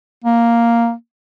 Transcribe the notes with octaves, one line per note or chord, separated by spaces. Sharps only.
A#3